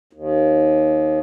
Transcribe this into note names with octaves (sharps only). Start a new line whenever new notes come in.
D#2